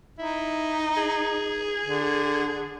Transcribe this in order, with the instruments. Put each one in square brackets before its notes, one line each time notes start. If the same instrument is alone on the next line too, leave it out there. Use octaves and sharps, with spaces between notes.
[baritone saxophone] D#4 [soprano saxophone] E4
[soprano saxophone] G#4
[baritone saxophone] D3